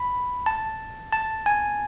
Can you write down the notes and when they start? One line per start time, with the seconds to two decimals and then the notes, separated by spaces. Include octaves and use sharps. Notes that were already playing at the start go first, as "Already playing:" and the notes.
Already playing: B5
0.46 A5
1.12 A5
1.46 G#5